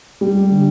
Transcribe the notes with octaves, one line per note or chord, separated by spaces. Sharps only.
G3
D3